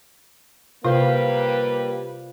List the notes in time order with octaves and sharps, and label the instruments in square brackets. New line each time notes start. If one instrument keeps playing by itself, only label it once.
[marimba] C3 [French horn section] G3 A#3 B4 [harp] F4 C5